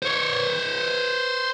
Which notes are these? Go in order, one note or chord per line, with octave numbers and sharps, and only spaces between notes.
C5 C#5